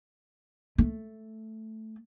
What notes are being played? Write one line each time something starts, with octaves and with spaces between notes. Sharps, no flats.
A3